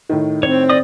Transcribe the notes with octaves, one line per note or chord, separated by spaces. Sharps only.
A2 D#3
C4 C#5
D5 D#5 D#6